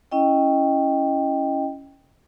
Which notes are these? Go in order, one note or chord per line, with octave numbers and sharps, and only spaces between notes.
C#4 E4 D#5 G5